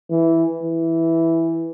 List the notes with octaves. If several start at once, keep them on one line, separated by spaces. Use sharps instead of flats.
E3
E3